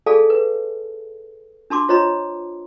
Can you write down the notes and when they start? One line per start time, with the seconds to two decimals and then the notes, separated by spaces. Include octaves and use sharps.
0.06 G#4 A4 D5 F5 G#5 A5
0.30 B4
1.70 D4 A5 C6 D6
1.88 F4 C5 C#5 D#5 A#5 C6